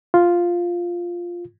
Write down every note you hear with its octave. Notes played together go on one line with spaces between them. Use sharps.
F4